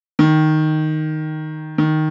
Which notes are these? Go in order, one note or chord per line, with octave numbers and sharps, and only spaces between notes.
D#3
D#3